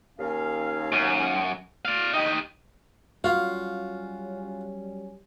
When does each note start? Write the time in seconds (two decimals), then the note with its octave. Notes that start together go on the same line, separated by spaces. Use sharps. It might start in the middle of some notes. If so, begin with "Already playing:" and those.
0.19 D#2 C#4 F5
0.92 F#2
1.85 D5 F5
2.14 D#4 G4 D#5 G5
3.24 F#3 G3 C#4 F4 F#4 F5